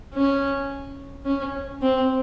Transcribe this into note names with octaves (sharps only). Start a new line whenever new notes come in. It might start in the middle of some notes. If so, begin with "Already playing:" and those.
C#4
C#4
C4